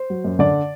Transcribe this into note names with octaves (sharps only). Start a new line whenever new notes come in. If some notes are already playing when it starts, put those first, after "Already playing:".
Already playing: C5
F#3
F#2
D3 D5